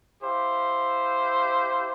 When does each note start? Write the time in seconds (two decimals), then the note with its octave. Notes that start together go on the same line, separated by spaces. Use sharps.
0.22 E4 G4 C5 F5